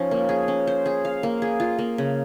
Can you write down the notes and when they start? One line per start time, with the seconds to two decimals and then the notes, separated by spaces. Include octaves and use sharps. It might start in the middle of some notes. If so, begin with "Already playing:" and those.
Already playing: F3 C#4 D#4
0.11 A#3
0.29 G#4
0.48 C#4
0.67 C5
0.86 G#4
1.05 F5
1.23 A#3
1.42 G#4
1.60 F4
1.78 A#3
1.98 C#3